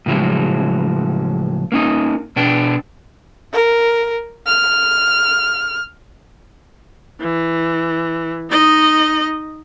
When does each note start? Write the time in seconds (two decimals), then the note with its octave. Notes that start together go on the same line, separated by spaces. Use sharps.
0.06 A2 C#3 F3 F#3 G#3
1.72 A#3 C#4 D#4
2.36 B2 D4 G5
3.53 A#4
4.47 F6
7.20 E3
8.50 D#4 D#5